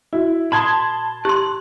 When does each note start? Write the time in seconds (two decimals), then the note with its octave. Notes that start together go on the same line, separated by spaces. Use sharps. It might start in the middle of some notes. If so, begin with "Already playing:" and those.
0.13 E4 F#4
0.52 A#2 A5 B5 C6 D#6 G#6
1.25 G4 C6 F#6